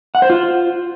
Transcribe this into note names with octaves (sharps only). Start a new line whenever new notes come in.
F#5
C5
F4